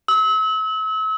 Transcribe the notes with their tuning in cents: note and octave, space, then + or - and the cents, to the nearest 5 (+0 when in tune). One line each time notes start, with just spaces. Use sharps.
E6 -35